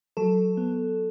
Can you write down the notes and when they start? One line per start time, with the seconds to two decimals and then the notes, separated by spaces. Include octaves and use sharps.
0.17 F#3 A4
0.57 B3